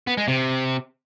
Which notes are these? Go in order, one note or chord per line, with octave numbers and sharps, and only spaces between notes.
B3
G#3
C3